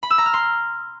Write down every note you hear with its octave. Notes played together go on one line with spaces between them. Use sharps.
B5
E6
A#5
F6
C6